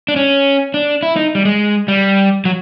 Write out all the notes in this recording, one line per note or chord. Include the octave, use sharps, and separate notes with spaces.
D4
C#4
D4
E4
D#4
G3
G#3
G3
F#3